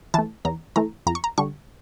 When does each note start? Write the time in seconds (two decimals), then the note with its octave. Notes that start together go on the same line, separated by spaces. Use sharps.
0.14 E3 A3 A5
0.45 E2 A#5
0.76 E3 A3 A#5
1.07 F2 A#5
1.15 C#6
1.24 A#5
1.38 D3 G3 C#6